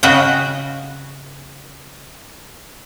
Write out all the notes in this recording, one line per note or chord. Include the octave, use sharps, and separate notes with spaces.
C#3 F#4 D#5 G5